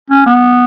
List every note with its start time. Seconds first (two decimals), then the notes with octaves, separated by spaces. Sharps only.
0.10 C#4
0.26 B3